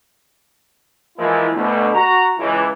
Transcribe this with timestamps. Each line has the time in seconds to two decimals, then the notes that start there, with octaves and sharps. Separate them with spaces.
1.18 E3 F3 G#3 A#3 E4
1.54 D2 B2 A3
1.95 F#4 A#5
2.39 C#2 E3